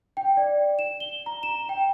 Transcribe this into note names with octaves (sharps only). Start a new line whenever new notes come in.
G5
D5
E7
G7
A#5
E7
G5